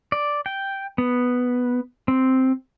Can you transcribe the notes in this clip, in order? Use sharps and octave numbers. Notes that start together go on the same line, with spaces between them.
D5
G5
B3
C4